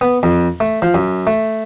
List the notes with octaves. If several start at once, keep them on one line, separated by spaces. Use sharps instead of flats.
B3
F2
A3
F3
F#2
A3